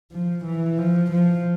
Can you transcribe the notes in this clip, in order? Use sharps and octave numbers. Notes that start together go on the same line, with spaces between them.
F3
E3
F3
F3